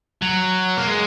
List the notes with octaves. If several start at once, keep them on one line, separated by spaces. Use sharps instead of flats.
F#3
A#3
G#3